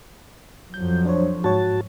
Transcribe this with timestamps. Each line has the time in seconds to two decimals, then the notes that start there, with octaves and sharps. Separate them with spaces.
0.74 F2 F3 F#3 G6
1.05 D4 C5 C#5
1.44 G#2 F#4 C#5 A5